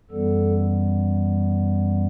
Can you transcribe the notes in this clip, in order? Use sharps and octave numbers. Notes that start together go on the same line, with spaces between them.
F#2 E3 G3 B3 A4